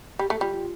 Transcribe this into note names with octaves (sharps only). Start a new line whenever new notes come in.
G3 G4
A3 A4
G3 F4
F4